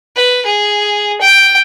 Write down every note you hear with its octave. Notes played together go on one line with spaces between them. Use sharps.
B4
G#4
G5